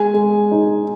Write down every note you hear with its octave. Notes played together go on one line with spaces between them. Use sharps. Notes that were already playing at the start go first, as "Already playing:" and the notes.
Already playing: G#3 G#5
G#3
D#4